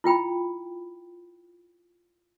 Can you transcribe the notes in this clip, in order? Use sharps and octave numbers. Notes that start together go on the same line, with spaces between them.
E4 F4 G5 B5